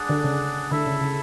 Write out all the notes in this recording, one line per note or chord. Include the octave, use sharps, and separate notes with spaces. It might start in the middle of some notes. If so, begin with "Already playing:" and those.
Already playing: D4 G#4 D5 F#5
D3
C#3
D3 E4 A4 E5
C#3
C#3